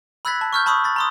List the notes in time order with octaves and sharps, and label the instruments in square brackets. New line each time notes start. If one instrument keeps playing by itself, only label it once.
[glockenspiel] B5 E6 F#6 G#6 A6 B6
A5
C#6 F6 G6
A5 B5 C#6 D#6 E6
B5 A6
A#5 C6 D#6